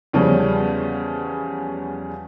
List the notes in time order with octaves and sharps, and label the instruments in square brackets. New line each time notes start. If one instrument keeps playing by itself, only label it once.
[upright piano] E2 C#3 F3 G3 C#4